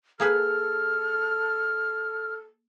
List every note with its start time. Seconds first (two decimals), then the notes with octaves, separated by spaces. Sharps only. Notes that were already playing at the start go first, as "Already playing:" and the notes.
0.20 A#3 G#4 A4 B4 F6